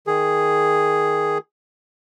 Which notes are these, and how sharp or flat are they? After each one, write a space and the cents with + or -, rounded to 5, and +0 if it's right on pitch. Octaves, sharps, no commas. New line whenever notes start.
D#3 +0 G#4 +0